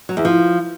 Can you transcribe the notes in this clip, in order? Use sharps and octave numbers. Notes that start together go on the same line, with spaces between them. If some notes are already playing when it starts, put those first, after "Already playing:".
F#3
E2
F3